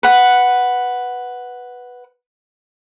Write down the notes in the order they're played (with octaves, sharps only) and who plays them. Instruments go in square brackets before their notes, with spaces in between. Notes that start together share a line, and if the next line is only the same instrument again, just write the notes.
[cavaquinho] B4 F#5